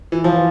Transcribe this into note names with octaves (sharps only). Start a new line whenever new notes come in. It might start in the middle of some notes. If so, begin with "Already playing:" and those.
E3
F3